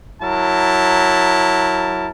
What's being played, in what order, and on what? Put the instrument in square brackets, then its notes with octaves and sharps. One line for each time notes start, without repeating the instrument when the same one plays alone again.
[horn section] F#3 E4 A#4 A5